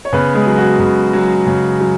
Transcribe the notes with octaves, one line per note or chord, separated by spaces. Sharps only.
C#5
C#3 B3 B4
G#3 G#4
F#3
F#4
C#3
F#3
C#3
F#3